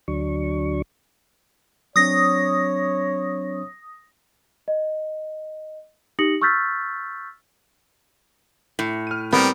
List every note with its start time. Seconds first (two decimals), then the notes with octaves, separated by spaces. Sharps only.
0.08 D2 F#3 D4 C#6
1.96 F#3 C4 D4 C#5 D#6 A#6
4.68 D#5
6.19 D#4 G4 D#6 A#6 C#7 F#7
6.42 C#6 E6 F6 G6 A6 B6
8.79 A2
9.07 F6 D#7
9.33 G3 B3 C4 A#4